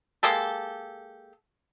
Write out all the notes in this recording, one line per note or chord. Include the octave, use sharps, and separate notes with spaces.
G#3 A#3 G4 A4